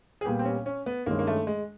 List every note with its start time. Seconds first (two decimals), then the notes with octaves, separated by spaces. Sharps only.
0.21 G#4
0.25 A#2 G3 B3 G4
0.39 C4
0.45 C#4
0.66 C#4
0.86 B3
1.06 G2 D#3 G#3 A#3 C#4
1.19 A#3
1.27 A3
1.47 G#3